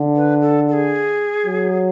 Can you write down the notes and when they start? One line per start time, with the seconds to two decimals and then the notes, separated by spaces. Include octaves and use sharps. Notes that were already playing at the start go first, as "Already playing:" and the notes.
Already playing: D3
0.16 B4
0.42 A4
0.68 A4
0.73 G#4
1.46 F#3